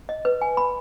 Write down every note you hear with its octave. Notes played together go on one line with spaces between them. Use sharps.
D#5
B4
G#5
B5